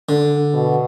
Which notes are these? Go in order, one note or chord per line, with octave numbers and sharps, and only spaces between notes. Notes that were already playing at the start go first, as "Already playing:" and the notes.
D3
B2